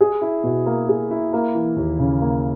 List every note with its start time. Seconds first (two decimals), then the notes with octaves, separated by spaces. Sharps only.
0.01 G#4
0.21 E4
0.44 B2
0.66 A#3
0.89 G#4
1.11 E4
1.33 A#3
1.55 E3
1.76 D#2
1.99 C#3
2.21 A#3